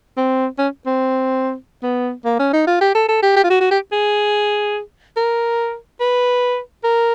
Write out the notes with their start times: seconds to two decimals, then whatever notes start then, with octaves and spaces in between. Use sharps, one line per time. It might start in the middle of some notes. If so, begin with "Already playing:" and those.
0.17 C4
0.58 C#4
0.86 C4
1.83 B3
2.25 A#3
2.39 C#4
2.53 D#4
2.67 F4
2.81 G4
2.95 A4
3.09 A4
3.23 G4
3.36 G4
3.44 F4
3.50 F#4
3.61 F#4
3.71 G4
3.92 G#4
5.17 A#4
6.00 B4
6.84 A#4